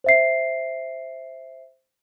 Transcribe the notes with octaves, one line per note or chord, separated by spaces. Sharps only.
C5 E5 C7